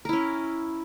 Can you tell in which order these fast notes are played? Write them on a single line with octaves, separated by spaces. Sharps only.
A#4 E4 C#4